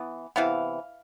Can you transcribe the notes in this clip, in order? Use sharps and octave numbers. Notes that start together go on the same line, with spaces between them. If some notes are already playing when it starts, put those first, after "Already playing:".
Already playing: E3 B3
C3 E3 B3 F5